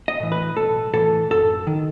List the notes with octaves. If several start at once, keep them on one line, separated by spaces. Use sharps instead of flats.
D#5
A2 E3
B4
B1 A4
A2 E3 A4
F#2 A4
D#3